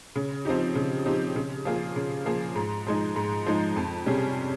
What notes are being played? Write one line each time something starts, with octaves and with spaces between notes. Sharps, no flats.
C#3
F3 C4 D#4 G4
C#3
F3 C4 D#4 G4
C#3
F3 A#3 F4 G#4
C#3
F3 A#3 F4 G#4
G#2
F3 G#3 D#4
G#2
F3 G#3 D#4
F2
C3 G3 C#4 G#4